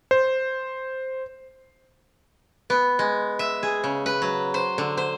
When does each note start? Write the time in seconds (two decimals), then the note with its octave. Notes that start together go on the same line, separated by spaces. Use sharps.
0.11 C5
2.70 B3
2.99 G#3
3.39 E5
3.63 G#4
3.84 C#3
4.06 B4
4.22 F#3
4.54 C5
4.78 D3
4.97 C5